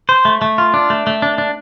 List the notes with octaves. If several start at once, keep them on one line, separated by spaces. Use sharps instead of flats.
C5
A3
A3
F4
D4
A3
A3
D4
D4